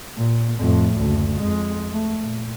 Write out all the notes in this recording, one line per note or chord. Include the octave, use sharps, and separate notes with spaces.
A#2
F2 A2
F#1 D2
F2 G#3
A3
A#2